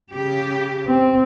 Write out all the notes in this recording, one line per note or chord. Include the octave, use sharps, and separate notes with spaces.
C#3 G4
C4